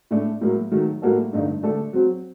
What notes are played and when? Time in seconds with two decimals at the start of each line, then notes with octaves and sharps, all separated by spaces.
0.11 A2 A3 D4
0.41 A2 F#3 A#3
0.72 D#3 F#3 A3
1.02 A2 G3 A#3 F#4 A4
1.33 G2 D3 A3 D#4
1.63 D3 A3 D4 A4
1.93 F#3 C4 F#4